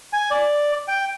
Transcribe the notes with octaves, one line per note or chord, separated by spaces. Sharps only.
G#5
D5
G5